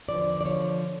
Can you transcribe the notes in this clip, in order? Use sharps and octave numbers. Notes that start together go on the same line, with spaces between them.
E2 D3 F3 D5
D5
D3 F3 C#5